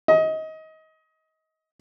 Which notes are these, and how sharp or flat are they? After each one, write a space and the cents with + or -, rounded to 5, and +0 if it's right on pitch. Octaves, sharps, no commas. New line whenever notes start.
D#5 +25